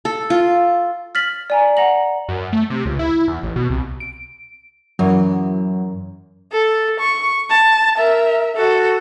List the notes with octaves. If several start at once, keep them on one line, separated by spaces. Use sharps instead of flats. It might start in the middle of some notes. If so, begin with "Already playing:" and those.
A4
F4
F6 A6 B6 F#7
D5 G#5 A#5
F#5 A#5 A#6 F#7
F#2
A3
C3
C#2
E4
E2
A1
B2
C2
D7
F#2 E3 F#3
A4
C#6
A5
A#4 E5
F#4 A4